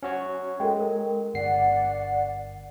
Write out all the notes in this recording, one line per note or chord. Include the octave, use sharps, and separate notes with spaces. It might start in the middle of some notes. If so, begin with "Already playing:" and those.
C#4 F#4 C#5
G#3 A4 A#4 G5
A#4
G1 D5 F#5 C7